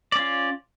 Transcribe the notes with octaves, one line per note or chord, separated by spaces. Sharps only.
C#4 F4 D5